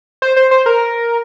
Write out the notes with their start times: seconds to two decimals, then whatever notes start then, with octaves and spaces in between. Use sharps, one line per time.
0.22 C5
0.36 C5
0.51 C5
0.66 A#4